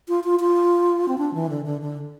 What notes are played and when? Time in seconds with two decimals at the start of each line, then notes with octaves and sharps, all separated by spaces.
0.08 F4
0.24 F4
0.40 F4
1.08 C4
1.18 D4
1.34 E3
1.49 D3
1.65 D3
1.81 D3